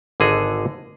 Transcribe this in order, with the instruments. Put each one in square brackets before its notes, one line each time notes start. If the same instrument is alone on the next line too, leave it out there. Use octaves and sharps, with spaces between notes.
[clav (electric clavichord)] G#1 D3 G#4 A4 D#5